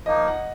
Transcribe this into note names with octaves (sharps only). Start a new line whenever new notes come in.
F3 A#3 D#4 D#5
F#5